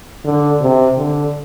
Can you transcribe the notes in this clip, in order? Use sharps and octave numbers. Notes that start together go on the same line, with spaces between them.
D3
C3
D3